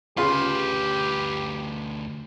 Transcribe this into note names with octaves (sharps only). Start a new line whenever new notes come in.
D2 C#3 F4 G4 B4 C6